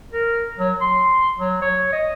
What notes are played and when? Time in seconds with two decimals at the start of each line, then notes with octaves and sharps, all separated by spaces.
0.13 A#4
0.59 F#3
0.81 C6
1.39 F#3
1.62 C#5
1.92 D#5